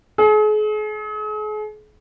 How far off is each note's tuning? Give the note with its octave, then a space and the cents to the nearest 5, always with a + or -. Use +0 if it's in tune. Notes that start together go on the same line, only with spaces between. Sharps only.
G#4 +40